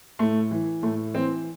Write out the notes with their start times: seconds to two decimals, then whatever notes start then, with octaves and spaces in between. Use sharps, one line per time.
0.19 A2 A3
0.51 E3
0.83 A2 A3
1.14 E3 C4